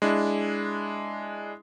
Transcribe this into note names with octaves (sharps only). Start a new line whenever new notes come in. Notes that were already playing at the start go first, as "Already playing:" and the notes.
G#3 D4 E4